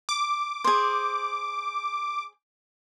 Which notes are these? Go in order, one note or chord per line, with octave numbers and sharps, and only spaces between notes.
D6
G#4 C5